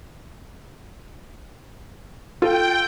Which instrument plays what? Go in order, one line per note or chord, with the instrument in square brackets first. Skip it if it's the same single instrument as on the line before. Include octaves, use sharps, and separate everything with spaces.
[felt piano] F4 A4 [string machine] G5